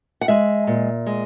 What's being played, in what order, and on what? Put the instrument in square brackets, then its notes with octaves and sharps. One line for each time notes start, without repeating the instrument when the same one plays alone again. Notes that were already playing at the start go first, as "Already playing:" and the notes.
[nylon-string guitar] F#5
G#3 E5
A#2
G#3